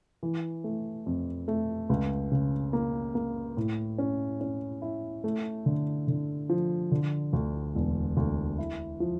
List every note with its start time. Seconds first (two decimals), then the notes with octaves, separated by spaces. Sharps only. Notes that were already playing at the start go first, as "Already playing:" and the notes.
0.23 E3
0.64 A3
1.06 F2
1.48 A3
1.89 C#2
2.32 C#3
2.73 A#3
3.15 A#3
3.57 A2
3.98 C#4
4.41 C#4
4.82 E4
5.24 A3
5.66 D3
6.08 D3
6.49 F3
6.91 D3
7.33 D2
7.75 E1
8.17 D2
8.58 E4
9.00 F3